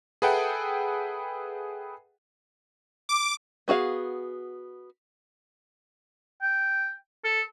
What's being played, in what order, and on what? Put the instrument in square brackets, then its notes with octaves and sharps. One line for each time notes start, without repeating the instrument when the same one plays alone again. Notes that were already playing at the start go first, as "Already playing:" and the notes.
[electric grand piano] G#4 A4 B4 E5 F#5 G5
[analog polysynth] D6
[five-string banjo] B3 F#4 G#4 F5
[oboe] G5
A4